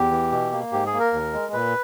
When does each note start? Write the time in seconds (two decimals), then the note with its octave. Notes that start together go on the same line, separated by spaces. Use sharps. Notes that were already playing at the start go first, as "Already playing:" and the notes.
Already playing: E2 G4
0.11 E3
0.32 B2
0.52 A#3
0.72 G#2 G4
0.86 G#4
0.93 A#3
0.99 A#4
1.13 D#2
1.33 G#3
1.53 A#2 B4